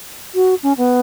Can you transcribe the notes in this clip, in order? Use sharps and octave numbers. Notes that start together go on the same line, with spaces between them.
F#4
C#4
B3